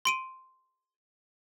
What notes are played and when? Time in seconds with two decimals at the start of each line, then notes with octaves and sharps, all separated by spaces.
0.05 C6 D7 D#7